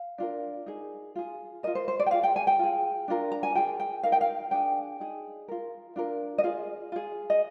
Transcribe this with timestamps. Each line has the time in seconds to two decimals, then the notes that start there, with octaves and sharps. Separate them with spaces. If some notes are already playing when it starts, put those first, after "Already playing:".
Already playing: F5
0.18 D4 F4 A#4
0.66 D#4 G#4
1.16 F4 G#4
1.63 F4 A#4 D#5
1.75 C5
1.88 C5
2.00 D5
2.06 G5
2.11 F4 G#4 F5
2.23 G5
2.36 G#5
2.47 G5
2.59 F4 G#4
3.08 D4 F4 A#4
3.32 A#5
3.43 G#5
3.55 F4 G#4 G5
3.80 G5
4.03 D#4 A#4 F5
4.12 G5
4.21 F5
4.51 D4 G#4 G5
5.00 D#4 G#4
5.48 F4 A#4
5.96 D4 F4 A#4
6.38 D#5
6.43 F4 G#4 F5
6.92 F4 G#4
7.30 D#5